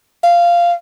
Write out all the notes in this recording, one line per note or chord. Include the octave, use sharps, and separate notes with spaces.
F5